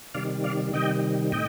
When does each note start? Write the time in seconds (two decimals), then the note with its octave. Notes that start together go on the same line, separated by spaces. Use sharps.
0.14 C3 D#3 G3 D5 F5
0.44 D5 F5
0.73 C3 D#3 G3 D#5 G5
1.32 A2 D#5 G5